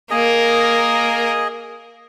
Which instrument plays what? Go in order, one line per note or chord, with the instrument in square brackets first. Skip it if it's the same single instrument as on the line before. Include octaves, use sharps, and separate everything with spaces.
[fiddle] A#3 A#4 [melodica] G#4 D#5